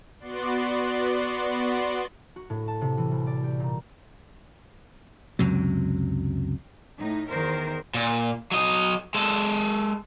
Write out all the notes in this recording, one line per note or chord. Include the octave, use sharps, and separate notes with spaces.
B3 F#4 D5 C6
F#4
A2
A5
C3
E3
C2
D5
G4
A#2
C#2 F#2 C3 F#3
A2 D#4
E2 D#3 A#4 C5
A#2
F#3 D#5
G#3 A4